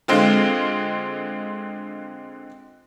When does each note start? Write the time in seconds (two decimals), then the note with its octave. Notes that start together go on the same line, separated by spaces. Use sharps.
0.08 D3 G#3 C4 F4